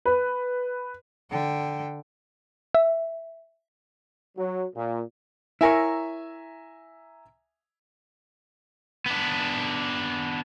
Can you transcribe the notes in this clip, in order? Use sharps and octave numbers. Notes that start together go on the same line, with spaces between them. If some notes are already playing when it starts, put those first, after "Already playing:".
B4
D3 G5
E5
F#3
A#2
E4 A#4 C#5 E5 G#5 A#5
B3 D4